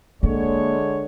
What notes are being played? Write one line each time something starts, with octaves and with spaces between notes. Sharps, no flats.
D3 G#3 A#3 C#5